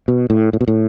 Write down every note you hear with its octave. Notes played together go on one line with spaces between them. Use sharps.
B2
A2
A2
B2
A2